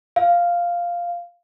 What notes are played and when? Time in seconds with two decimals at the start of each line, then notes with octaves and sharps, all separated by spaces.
0.16 F5